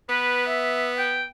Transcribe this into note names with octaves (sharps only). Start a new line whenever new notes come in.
B3 B4
E5
G5